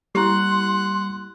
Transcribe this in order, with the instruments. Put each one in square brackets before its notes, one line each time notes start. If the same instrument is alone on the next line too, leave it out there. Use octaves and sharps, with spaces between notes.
[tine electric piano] G3 A#3 [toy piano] E4 G4 [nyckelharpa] F#5 [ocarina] C6